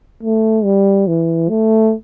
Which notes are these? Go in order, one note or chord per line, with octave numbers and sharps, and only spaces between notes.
A3
G3
E3
A3